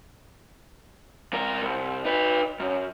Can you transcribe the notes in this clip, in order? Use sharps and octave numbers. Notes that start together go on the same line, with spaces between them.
C3 A#4
C2
D#4 B4
F#2